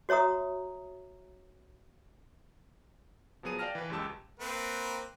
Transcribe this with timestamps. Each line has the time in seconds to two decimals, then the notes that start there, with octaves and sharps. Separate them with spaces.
0.09 F#4 C#5 E5 A#5 D#6
3.43 F3 F#3 B3 G#4 D#7
3.59 D5 F5 G5 A5 F6 A#6
3.75 E3 B4
3.90 C#2 F#2 G#3 G4 A5 E6
4.39 A#3 C4 B4